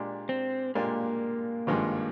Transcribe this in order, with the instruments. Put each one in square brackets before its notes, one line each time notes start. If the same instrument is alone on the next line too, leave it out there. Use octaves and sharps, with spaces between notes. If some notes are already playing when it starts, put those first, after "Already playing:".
Already playing: [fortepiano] A#2 G#3 D4 G4 D5
[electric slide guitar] C4
[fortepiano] A#2 G#3 D4 G4 D5 [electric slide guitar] A#3
[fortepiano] G#1 G2 F3 G#3